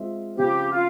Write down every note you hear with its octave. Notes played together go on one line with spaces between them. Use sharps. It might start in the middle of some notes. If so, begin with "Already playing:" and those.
Already playing: G#3 C4 F4 E5
C#3 F3 C4 G4
F4